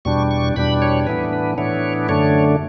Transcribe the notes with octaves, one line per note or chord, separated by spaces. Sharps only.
E2 B2 G3 D4 C#6
C#6
E2 B2 G3 D4 B5
C#5
A2 E3 B3 D4 B4
B4
A2 E3 B3 D4 C#5
F#2 D3 A3 D4 C#5